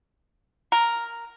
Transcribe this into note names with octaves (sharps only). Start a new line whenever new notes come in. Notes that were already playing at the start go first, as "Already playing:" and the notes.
A#4